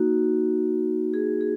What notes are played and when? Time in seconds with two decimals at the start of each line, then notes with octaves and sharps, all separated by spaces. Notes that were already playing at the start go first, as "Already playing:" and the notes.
Already playing: A#3 D#4 F#4
1.14 G#4
1.41 G#4